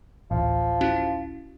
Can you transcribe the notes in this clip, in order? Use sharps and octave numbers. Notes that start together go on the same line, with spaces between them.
D1 A1 F3
C#4 E4 F#4